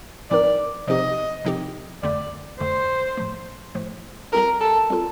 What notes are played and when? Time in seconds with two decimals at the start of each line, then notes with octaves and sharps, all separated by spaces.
0.30 A2 F3 C4 D#4 A#4 D5
0.87 C3 F3 C4 D#4 G4 D#5
1.45 C3 F3 C4 D#4 G4
2.02 F2 D3 A3 D5
2.60 F2 D3 A3 C5
3.17 A2 F3 A3
3.75 A2 F3 A3
4.32 G3 C4 F4 A4 A#4
4.61 A4
4.90 G3 C4 F4 A4